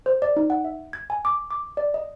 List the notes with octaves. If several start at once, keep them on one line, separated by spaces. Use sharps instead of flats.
C5
D5
D#4
F#5
E5
G#6
G#5
D6
D6
D5
D#5